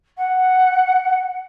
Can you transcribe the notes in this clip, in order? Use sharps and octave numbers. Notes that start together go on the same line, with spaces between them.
F#5